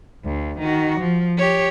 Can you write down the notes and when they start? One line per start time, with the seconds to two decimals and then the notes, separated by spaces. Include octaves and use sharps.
0.25 D2
0.58 D#3 F#4
0.99 F3
1.38 G4 C#5